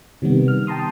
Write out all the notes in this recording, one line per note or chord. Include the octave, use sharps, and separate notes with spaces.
C3 D#3 G3 B3
F6
G5 A5 A#5 C6 D#6